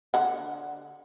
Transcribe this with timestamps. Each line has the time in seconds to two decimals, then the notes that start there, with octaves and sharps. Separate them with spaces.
0.14 D3 F#5